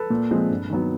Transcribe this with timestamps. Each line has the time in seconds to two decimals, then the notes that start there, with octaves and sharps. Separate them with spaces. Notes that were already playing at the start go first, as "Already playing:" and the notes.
Already playing: A4 B4
0.10 A#2
0.31 F3 G#3 C4
0.50 G2
0.70 D#3 F#3 B3